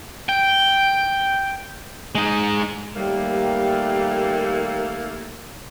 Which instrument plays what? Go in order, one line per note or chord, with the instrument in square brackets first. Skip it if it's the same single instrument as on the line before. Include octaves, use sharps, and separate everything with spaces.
[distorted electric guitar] G5
G#3 D#4
[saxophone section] D#2 A3 A#3 [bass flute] G3